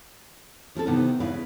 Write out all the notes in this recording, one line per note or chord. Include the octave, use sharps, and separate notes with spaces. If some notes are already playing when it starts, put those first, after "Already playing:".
D#3 F3 C4 A4
C3 D#3 E3 B3 D#4
E2 C#3 E4 B4 F5